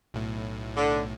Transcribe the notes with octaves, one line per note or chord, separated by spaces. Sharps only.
B1 A2
D3